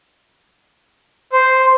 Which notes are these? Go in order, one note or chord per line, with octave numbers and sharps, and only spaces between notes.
C5